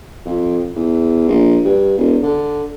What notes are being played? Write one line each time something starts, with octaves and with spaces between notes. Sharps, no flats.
F2
E2
A#1
G2
E1
D3